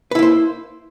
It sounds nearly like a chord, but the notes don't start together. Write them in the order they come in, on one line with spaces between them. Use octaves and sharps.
B4 E4 A#3 C5